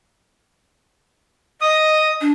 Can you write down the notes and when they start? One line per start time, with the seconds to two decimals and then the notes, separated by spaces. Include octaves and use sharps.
1.61 D#5 D#6
2.21 D4